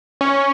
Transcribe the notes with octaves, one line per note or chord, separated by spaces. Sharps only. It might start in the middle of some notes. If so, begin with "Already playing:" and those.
C#4